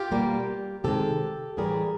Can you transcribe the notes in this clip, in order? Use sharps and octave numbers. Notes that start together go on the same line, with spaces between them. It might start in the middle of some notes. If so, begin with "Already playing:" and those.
Already playing: F4 G4
B2 G3 A#3
C3 D#3 G#3 G4 A4
A2 E3 G3 G#4 A#4